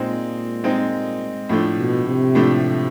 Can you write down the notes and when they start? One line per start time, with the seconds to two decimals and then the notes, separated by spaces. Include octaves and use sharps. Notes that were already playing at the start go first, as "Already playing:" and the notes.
Already playing: A#2 G#3 C4 D#4
0.64 G#3 C4 D#4
1.49 A2 F3 A3 D4
1.78 B2
2.06 C3
2.35 A2 F3 A3 D4